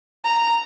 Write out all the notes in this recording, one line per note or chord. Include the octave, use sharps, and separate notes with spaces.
A#5